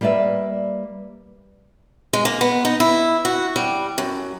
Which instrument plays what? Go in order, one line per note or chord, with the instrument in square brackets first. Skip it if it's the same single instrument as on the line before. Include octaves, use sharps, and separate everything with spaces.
[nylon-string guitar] G3 A#3 B4 D5 E5
[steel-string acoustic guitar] G#3
A#3
B3
D#4
E4
F#4
G3
F#2